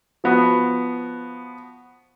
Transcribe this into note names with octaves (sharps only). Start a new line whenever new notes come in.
F3 B3 F#4